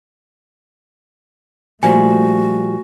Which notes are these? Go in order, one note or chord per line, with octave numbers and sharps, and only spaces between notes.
A#2 F3 G3 A3 F#4 G#5